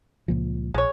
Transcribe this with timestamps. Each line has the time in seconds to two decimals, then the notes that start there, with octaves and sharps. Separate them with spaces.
0.28 C#2 A#2 F3
0.74 A#1 G#3 C#5